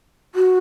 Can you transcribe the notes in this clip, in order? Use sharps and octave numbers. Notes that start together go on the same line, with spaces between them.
F#4